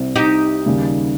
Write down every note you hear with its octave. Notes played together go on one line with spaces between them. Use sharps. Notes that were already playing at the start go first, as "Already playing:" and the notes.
Already playing: C2 C3 G3 C4
D#4 G4
D#2 C#3 G3